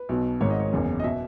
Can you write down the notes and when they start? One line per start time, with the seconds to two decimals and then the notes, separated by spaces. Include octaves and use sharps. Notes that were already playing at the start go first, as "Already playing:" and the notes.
Already playing: B4
0.09 B1 B2
0.41 G#1 G#2 D#3 C#5
0.50 D#5
0.60 C#5
0.72 F#1 E2 C#3
1.00 D#5
1.04 B2 E5